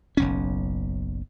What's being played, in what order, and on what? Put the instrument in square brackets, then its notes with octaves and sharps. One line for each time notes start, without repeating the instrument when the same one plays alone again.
[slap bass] F#1 B1 C#4